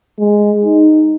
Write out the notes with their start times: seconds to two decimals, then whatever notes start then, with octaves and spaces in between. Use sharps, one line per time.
0.20 G#3
0.65 D#4